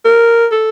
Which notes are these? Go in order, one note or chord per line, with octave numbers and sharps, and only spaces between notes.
A#4
A4